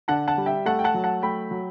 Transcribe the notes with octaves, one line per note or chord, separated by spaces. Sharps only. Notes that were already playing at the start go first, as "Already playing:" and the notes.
D3 F#5 A5
F#5 A5
G3
E5 G5
A3 F#5 A5
G5
F#5 A5
F#3
F#5 A5
A3 G5 B5
F#3